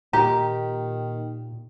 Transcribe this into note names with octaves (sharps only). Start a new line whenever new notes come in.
A#2 D#3 G4 A#5